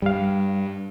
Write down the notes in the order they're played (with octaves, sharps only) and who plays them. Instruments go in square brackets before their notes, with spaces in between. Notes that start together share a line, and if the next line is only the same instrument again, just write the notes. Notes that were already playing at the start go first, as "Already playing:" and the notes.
[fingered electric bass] G2 [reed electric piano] G3 F5